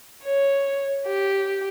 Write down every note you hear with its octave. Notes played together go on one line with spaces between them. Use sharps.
C#5
G4